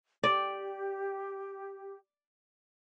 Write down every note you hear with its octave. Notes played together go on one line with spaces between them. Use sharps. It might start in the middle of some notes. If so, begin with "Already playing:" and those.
G4 D5